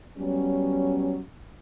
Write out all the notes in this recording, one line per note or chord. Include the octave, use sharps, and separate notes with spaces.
F#3 G3 B3 C#4